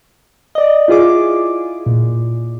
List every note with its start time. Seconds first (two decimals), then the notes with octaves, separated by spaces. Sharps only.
0.55 D5 D#5
0.88 E4 F4 G#4 D6
1.86 A#2